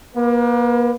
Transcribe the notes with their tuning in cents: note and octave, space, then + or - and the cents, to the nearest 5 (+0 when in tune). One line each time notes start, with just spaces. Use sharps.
A#3 +35 B4 +5